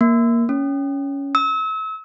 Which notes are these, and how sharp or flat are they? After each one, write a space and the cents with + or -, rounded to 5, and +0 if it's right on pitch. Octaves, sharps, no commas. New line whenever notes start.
A#3 +5
C#4 +10
E6 -35